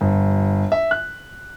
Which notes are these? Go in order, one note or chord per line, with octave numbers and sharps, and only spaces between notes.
G1
E5
F#6